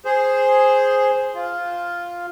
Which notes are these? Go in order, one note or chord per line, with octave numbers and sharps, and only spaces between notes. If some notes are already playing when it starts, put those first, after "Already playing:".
G#4 C5
F4